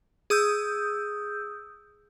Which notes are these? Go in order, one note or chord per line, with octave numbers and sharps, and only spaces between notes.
G#4 D#6 E6 G6